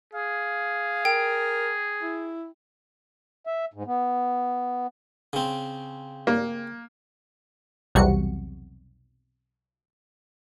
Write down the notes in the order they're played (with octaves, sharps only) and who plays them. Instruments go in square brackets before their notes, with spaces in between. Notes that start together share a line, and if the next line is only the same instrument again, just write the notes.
[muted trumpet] G#4 [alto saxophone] F5
[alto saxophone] A#4 [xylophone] G5
[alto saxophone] E4
[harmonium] E5
G#2
B3
[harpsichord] C#3 C4
[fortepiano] A#3
[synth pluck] B1 E2 C3 G3 F#4 C#7